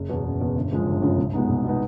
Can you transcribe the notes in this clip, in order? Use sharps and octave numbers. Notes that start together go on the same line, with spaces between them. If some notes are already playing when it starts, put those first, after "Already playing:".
Already playing: F#1
E2 B2
F#1
E2 B2
G1
F#2 C#3 F3 G#3
G1
F#2 C#3 F3 G#3
C2
B2 G#3 B3 D#4
C2
B2 G#3 B3 D#4